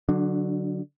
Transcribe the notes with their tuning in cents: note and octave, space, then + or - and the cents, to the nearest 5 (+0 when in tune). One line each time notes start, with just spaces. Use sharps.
D3 -15 F#3 +0 D4 +25